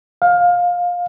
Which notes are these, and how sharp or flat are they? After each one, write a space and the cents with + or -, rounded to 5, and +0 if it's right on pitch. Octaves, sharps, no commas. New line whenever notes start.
F5 +20